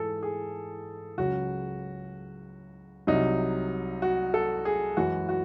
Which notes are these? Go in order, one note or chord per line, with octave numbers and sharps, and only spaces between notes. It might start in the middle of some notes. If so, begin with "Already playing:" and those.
Already playing: G#2 E3 G#4 A4
G#4
C#2 C#3 F#3 F#4
C2 C3 F#3 D#4
F#4
A4
G#4
F#2 E3 G#3 F#4
F#4